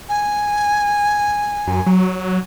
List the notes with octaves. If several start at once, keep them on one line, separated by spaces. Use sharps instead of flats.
G#5
F#2
F#3